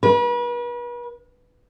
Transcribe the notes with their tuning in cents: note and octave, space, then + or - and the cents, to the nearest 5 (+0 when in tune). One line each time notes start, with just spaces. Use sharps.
B4 -40